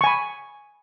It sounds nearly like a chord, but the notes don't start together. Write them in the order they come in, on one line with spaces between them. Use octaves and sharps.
C#6 G#5 B5